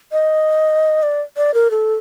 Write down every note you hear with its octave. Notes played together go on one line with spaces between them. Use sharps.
D#5
D5
D5
A#4
A4